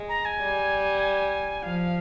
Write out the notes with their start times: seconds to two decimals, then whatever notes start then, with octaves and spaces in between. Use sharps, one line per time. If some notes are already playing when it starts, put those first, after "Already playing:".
Already playing: G#3
0.09 A#5
0.25 G#5
0.40 G3
1.63 F3 F5